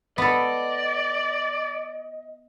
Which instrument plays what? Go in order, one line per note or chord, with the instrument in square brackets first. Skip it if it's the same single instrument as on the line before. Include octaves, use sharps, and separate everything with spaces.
[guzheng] B3 A4 [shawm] D5 [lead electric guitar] D#5